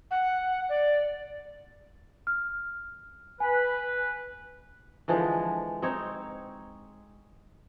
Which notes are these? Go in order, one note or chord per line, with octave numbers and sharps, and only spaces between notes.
F#5
D5
F6
B4 G#5
D3 E3 F3 G#3
C4 D#4 C#5